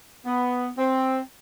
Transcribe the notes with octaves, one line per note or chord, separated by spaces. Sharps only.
B3
C4